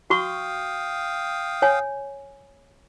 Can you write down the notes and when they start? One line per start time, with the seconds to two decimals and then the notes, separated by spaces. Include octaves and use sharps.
0.10 F#4 F5 G5 C#6 D#6
1.62 C#5 G#5